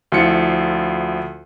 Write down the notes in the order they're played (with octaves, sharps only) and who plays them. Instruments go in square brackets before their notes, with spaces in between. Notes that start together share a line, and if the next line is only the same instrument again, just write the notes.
[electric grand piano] D2 F3 E4 F4 C#7